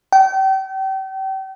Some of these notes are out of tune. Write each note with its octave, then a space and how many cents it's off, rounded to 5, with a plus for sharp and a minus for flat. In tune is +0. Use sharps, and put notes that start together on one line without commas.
G5 -35